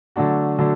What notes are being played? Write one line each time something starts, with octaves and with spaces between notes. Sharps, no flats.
D3 F#3 A3 D4 F#4
D3 F#3 A3 D4